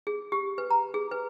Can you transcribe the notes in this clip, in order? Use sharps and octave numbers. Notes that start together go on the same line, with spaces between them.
G#4
G4
B4
A#5
G#4
B4